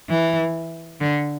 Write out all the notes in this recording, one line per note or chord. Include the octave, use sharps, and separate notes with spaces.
E3
D3